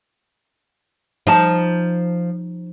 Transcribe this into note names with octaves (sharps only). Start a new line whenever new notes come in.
F3 D#4 A5